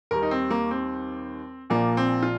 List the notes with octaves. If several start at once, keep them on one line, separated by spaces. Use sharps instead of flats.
D#2 D#3 G3 A#4
D#4
C4
A#3
C4
A#1 A#2 F3 A#3
C4
F4